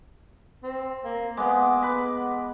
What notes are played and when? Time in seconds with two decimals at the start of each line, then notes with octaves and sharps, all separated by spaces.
0.63 C4
1.04 A#3
1.37 G#3 B3 D6
1.83 B4